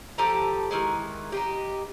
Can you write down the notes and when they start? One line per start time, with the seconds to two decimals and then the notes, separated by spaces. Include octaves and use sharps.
0.18 F3 G4 A4 A#5
0.71 D#3 E3 G#3
1.32 D#4 F4 G4